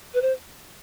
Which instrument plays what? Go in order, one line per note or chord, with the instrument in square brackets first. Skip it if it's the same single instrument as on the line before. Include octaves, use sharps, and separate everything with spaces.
[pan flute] B4
C5